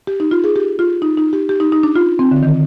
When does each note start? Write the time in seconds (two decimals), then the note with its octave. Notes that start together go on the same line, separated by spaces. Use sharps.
0.07 G4
0.20 D#4
0.31 F4
0.44 G#4
0.56 G4
0.79 F4
1.02 D#4
1.17 D#4
1.33 G4
1.49 G4
1.60 D#4
1.72 D#4
1.83 D4
1.96 F4
2.19 C4
2.31 D3
2.43 D#3